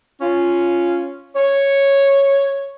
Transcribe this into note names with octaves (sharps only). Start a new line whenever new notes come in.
C#4 F4
C#5